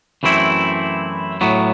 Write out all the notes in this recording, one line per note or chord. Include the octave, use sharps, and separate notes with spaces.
F#2 E3 A3 C4 E4
A2 F#3 B3